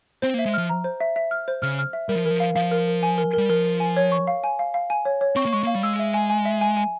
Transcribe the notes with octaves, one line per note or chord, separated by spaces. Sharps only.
C4 C5
A#3
E5
G#3
F3 F6
A#5
C5
E5
E5
F6
C5
C#3 F6
F6
E5
G3 A#4
F3
E3 A#4
F3
F5
F3 F5
A#4
A#4
G#5
A#4
G3 A#4
F3 A#4
A#4
G#5
C#5
C#6
F5
G#5
F5
F5
G#5
C#5
C#5
C4 C#6
A#3
G#3 C#6
A#3 F5
G3
G#3 E6
E5
G#5
G#5
E5
G#5
G#5